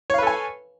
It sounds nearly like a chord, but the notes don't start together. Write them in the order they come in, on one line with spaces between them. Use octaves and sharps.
C#5 F5 B4 A4 G#5